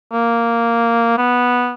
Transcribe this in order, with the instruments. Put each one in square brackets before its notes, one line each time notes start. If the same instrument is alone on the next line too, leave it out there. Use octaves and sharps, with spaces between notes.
[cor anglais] A#3
B3